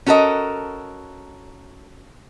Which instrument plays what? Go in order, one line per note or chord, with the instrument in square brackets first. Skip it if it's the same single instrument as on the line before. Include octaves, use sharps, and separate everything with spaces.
[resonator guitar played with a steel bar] C#4 F#4 A4 A#4 D#5